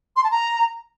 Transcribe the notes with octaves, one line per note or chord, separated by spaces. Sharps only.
C6
A5
A#5